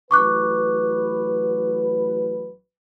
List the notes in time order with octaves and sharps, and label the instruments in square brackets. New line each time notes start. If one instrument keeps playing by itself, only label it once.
[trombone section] A1 F#3 B4 [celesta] C#6 D6 F#6